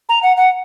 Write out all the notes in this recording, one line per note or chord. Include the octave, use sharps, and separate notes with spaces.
A#5
F#5
F#5